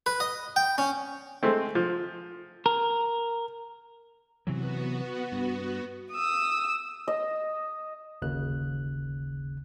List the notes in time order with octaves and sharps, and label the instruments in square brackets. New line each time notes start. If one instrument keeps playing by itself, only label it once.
[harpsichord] B4
D#5
G5
C#4
[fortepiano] G#3 A3 C4
F3
[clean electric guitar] A#4
[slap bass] C3 E3 F#3 [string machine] B3 F#4
[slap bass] G2
[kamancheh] D#6 E6
[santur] D#5
[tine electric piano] G1 D#2 C#3 F#6